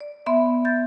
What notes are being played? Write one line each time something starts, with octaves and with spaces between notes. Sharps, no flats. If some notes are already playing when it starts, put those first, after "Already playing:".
D5
B3 E5 C6
G6 A6